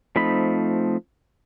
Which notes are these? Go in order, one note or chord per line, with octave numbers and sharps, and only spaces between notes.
F3 A3 C4 D#4 B5